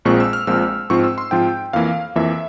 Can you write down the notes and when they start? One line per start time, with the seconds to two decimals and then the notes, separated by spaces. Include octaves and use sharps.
0.05 A#1 A#2 F3 G#3 C4 C#6
0.20 E6
0.33 F6
0.47 A#1 A#2 F3 G#3 C4 E6
0.90 G#2 F3 C4 F4 C#6
1.04 E6
1.18 C6
1.31 G#2 F3 C4 F4 G5
1.73 F2 E3 A#3 F5
2.16 F2 E3 A#3 E5